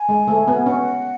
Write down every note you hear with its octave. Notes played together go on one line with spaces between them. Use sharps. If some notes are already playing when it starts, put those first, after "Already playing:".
Already playing: G#5
G#3
A3
B3
C#4 F#5